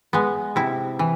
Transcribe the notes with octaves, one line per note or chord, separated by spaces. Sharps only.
G#3 B3
C3 E4
E3